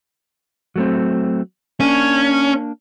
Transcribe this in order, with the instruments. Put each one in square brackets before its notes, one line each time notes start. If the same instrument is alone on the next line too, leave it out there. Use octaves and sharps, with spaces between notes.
[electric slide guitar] F#3 A3 C4
[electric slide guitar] A#3 D4 [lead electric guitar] C#4